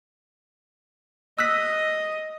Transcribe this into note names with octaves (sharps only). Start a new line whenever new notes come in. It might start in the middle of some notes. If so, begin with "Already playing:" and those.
D#5 E6 F#6 B6